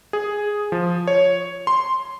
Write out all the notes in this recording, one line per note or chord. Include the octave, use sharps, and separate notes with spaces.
G#4
F3
C#5
C6